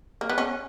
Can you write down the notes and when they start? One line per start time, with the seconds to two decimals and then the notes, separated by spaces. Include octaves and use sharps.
0.21 A#3
0.29 B3
0.38 C#4